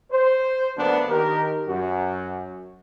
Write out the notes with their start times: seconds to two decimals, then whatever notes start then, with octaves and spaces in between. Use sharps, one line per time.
0.11 C5
0.76 D2 D3 F#3 A#3 B3 D4
1.09 D#3 G4 A#4
1.67 F#2 F#4